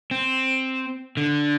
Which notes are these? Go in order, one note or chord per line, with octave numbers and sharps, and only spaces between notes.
C4
D3